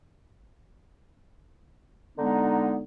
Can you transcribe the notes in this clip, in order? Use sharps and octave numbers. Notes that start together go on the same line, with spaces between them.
D3 G#3 B3 D#4